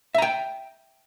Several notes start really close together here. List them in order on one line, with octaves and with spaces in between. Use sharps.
E5 A#5 G5